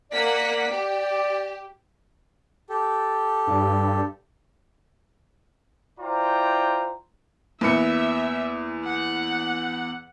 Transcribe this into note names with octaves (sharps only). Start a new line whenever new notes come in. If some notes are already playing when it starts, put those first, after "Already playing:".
A#3 D5 F#5 B6
G4
G4 A4
G2
E4 F4 C5 D5 G5 A#5
E2 A#3 B4 E5 C#7
F#5